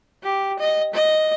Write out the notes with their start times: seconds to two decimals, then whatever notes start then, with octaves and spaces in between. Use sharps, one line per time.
0.23 G4
0.59 D#5
0.93 D#5